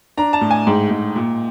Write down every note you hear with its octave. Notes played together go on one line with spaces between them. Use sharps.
D4 A#5
A5
A2
G#5
G#2 G5
G#2
A#2